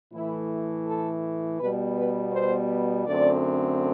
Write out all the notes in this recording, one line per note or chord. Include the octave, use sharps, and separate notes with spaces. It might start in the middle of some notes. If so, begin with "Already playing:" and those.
A2 E3 A3 E4
A4
B2 G3 B3 B4
B4
C5
F#2 D3 A3 C4 D5